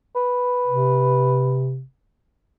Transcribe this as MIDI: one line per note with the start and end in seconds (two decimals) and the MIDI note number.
0.15 1.72 71
0.67 1.82 48